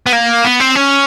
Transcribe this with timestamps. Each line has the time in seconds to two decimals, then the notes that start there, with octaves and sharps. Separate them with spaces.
0.06 B3
0.13 A#3
0.45 B3
0.60 C4
0.75 C#4